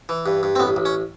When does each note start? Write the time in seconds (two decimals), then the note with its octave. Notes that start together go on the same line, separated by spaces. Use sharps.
0.09 E3
0.26 G2
0.43 G2
0.56 C4
0.60 A1 B3
0.76 A1
0.85 C#4